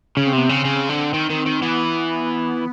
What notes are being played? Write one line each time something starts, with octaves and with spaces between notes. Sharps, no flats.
C#3 C#4
C4
C3 B3
C#3 C4
C#3
D3
D#3
D#3
D#3
E3 B3